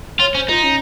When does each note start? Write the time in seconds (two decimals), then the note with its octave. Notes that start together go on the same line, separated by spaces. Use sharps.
0.20 F4 C#5
0.34 C#4 C5
0.49 D#4 F4
0.64 C#4